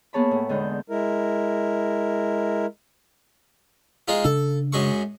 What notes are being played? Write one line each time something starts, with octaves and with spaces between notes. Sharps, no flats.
A#3 B3 G#4 C#5 A5 B5
A2
E2 D3 G#3 D#4 G6
G#3 E4 A#4
G#3 D#4 F4
C#3 D4 A4
F#2 G#3 C#6